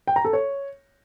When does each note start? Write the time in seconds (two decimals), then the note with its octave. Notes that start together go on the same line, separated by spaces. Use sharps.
0.07 G5
0.16 A#5
0.25 A4
0.33 C#5